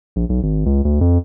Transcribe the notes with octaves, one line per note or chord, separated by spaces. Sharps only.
A#1
B1
G#1
C#2
D2
F2